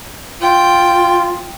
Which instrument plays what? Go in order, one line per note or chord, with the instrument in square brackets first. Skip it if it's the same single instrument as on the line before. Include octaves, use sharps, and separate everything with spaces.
[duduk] F4 [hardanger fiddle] G5